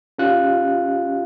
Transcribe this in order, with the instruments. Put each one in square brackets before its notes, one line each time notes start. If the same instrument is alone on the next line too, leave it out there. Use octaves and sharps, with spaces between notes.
[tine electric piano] C#4 F4 G4 F5 F#6